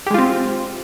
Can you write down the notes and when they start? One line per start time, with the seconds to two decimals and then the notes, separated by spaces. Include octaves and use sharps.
0.07 G4
0.10 G#3
0.14 F4
0.18 C4